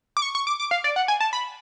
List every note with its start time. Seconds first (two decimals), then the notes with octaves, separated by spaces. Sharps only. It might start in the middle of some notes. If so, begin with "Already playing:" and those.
0.17 D6
0.22 C#6
0.35 C#6
0.47 D6
0.60 D6
0.71 F5
0.84 D5
0.96 F#5
1.08 G#5
1.20 A5
1.33 B5